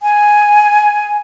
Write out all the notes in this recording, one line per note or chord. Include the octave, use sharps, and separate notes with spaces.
G#5